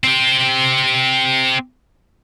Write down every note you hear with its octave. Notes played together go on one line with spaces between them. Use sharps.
C4 G4